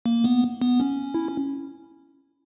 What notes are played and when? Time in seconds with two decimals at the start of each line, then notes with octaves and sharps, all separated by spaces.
0.06 A#3
0.24 B3
0.62 B3
0.80 C#4
1.14 E4